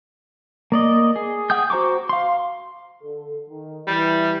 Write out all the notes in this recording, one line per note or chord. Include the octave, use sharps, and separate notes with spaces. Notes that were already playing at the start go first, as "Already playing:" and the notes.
A#3 D5 D#5
G#4
G#4 F#5 G5 D#6 G6
F#4 C5 A#5 C#6 D6
F5 C6
D3 A4
D#3
E3 G3